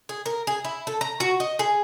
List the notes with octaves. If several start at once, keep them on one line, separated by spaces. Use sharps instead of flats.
G#4
A#4
G#4
E4
A4
A#5
F#4
D#5
G#4